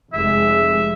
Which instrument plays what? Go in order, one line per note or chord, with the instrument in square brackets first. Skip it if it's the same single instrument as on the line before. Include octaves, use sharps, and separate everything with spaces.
[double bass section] F1 G#3 [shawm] E5